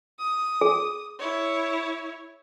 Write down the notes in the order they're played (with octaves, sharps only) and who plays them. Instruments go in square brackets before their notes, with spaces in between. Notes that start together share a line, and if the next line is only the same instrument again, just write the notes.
[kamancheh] D#6
[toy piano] G#4
[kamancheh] E4 C#5